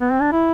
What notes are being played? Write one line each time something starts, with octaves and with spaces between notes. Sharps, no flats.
B3
C4
D4
E4